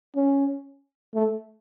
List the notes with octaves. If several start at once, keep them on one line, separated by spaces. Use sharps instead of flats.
C#4
A3